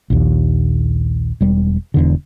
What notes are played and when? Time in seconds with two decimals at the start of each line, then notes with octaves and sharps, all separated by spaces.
0.10 A#1 D#2
1.41 E1 G3
1.94 E1 E2 D3